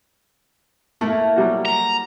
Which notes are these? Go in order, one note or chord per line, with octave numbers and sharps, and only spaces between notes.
A3 A#3 E4 A4
F#3 G3 F#4
A#5